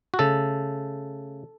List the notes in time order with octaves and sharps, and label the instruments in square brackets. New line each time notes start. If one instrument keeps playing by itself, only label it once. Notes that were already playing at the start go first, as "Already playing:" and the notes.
[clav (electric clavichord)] F#4
C#3 A3 A4